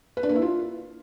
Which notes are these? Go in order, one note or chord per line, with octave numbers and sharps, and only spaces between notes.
B4
D4
A#3
E4
F4